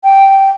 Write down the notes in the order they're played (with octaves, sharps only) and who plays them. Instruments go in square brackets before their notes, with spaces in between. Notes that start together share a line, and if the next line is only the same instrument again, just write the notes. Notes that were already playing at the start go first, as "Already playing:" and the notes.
[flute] G5